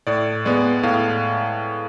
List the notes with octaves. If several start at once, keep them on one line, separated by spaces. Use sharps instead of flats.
A2 D5
G#3 B3 D5
A2 F5